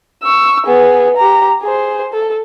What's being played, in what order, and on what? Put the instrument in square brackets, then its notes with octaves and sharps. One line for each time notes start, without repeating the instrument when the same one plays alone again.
[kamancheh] C#6 E6
B3 G#4
G4 A#5
G#4 C5
A4